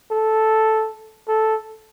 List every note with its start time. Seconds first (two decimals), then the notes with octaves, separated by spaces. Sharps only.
0.11 A4
1.28 A4